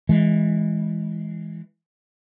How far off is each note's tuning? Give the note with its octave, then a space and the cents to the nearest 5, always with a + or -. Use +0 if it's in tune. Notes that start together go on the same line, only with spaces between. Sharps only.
E3 -10 G#3 +0